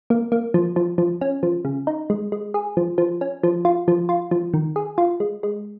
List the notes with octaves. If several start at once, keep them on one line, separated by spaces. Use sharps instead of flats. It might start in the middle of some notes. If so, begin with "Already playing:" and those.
A#3
A#3
F3
F3
F3
C#4
F3
C#3
D#4
G#3
G#3
G#4
F3
F3
C#4
F3
F4
F3
F4
F3
D#3
G#4
F4
G#3
G#3